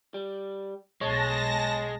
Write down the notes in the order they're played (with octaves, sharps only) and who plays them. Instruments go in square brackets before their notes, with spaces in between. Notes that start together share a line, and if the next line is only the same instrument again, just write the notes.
[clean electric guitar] G3
[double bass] B1 [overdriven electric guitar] G#3 [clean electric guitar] C#5 [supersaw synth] A5 A#6